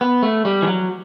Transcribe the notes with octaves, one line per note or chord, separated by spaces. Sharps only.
B3
A3
G3
E3
F#3